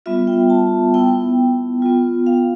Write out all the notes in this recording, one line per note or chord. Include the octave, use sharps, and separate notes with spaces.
G3 B3 F4 E5
G5
A5
B3 E4 G5
B3 F4
F5